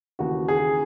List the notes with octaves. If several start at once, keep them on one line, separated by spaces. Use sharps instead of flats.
D#2 C#3 E3 F#4
G#4